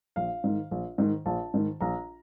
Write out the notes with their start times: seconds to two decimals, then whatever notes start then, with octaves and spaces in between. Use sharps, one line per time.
0.16 A#1 F5
0.44 G#2 D#3
0.71 A#1
0.98 G#2 D#3
1.26 A#1 A5
1.54 G#2 D#3
1.81 A#1 A#5